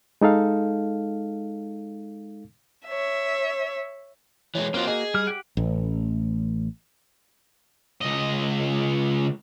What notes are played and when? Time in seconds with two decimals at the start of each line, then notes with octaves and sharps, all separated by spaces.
0.21 G#3 D#4 A4 F5
2.87 C#5 E5
4.55 E3 G3 G#3 C#5
4.74 A#3 C4 F4 F#4
4.87 G#4 D#5
5.14 G3 F6
5.27 G4 F#5 D7
5.57 A1
8.01 C#2 D#5